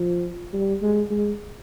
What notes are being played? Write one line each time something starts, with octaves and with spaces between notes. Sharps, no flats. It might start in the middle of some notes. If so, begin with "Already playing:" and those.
Already playing: F3
G3
G#3
G#3